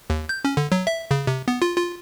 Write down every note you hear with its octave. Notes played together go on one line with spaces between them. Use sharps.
D#2
G6
C#4
D3
F#3
E5
C#3
C3
B3
F4
F4